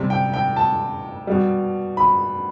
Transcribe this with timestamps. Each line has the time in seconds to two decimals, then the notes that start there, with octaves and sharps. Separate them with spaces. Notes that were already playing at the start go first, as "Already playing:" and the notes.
Already playing: C3 G3
0.10 G5
0.34 G5
0.56 A5
1.27 B2 G3
1.97 B5